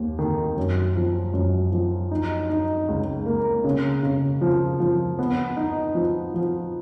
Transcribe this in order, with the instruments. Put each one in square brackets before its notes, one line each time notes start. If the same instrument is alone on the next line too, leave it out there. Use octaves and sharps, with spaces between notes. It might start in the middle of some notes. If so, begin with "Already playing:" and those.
Already playing: [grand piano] D#2
D#3
F#2
F3
F#2
F3
D#4
D#4
C#2
A#3
C#3
C#3
F3
F3
B3
D#4
F3
F3